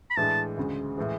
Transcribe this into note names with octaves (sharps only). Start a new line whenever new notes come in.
B5
A2 E3 G#3 D4 A5
D2 C#3 G#3
A2 E3 G#3